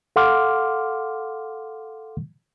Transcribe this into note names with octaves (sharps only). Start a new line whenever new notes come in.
A4 F5 F#5 C6 D6 F6